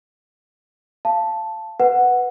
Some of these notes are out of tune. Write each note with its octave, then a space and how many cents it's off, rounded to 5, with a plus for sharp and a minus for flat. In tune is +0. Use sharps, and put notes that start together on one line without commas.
F5 -20 A5 +0
B4 +0 F#5 -5